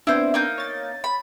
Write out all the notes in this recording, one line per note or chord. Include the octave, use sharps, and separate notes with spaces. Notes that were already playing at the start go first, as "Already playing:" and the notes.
B3 C4 D4 E4 C5
A#3 D#4 G6
C#5 A6
B5